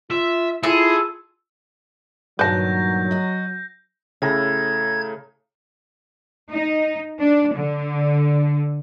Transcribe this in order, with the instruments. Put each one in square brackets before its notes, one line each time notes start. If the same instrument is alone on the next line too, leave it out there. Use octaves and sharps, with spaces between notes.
[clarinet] F4 [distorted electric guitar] E5
[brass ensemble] E4 [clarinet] F4 [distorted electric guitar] G#4 [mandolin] A4
[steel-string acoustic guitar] G2 A#2 D#3 [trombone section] F#3 [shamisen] B4 A5 [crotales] G6 A#6
[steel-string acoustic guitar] F#4 D#5
[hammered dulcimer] A2 A#5 [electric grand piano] C#3 [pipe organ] G#6
[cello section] D#4
D4
D3